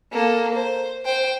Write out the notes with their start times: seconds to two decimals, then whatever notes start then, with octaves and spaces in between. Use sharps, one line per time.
0.12 A#3 A4
0.54 C5
1.05 C5 G5